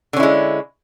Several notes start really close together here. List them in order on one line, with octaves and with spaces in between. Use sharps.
D3 C#4 E4 G#3